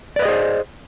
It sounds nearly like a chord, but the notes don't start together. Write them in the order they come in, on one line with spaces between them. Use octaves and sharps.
D5 B4 D#5 G#4 C5